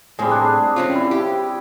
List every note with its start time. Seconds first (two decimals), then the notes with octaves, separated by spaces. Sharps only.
0.19 A2 G3 G#3 C4 G#4
0.31 D4
0.76 C4 C#4 F4
0.95 E4
1.11 G4